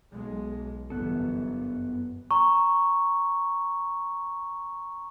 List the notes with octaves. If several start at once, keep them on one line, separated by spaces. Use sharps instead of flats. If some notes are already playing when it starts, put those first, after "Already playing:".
B1 G#3
G1 F#2 E3 B3 A4
A#5 C#6